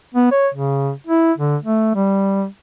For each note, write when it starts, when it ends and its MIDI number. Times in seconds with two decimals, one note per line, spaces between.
0.15 0.29 59
0.32 0.48 73
0.54 0.91 49
1.07 1.33 64
1.38 1.57 50
1.63 1.93 57
1.95 2.46 55